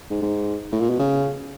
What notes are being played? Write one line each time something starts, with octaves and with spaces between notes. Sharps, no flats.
G#2
G#2
A2
A#2
B2
C#3